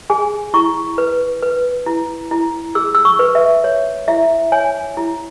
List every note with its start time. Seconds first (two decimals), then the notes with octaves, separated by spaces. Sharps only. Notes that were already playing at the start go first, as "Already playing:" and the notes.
0.10 G#4 G#5
0.54 E4 C#6
0.98 B4
1.42 B4
1.86 E4
2.31 E4
2.75 G#4 E6
2.95 E6
3.05 C#6
3.19 B4
3.35 E5
3.64 C#5
4.08 E4 E5
4.52 C#5 G#5
4.97 E4